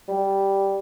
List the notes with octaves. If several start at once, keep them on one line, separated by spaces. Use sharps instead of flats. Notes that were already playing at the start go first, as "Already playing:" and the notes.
G3